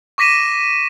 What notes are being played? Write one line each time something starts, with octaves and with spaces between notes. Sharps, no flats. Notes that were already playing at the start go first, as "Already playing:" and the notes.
C#6 D6 A#6 B6 D#7 E7